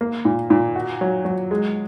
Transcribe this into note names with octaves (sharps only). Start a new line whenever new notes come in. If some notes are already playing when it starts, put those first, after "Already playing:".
A#3
A#2
A#2
F#4
F#3
F#3
G#3